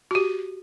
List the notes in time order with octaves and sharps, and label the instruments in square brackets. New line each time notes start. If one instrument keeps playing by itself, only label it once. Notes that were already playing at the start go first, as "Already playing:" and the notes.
[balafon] F#4
G4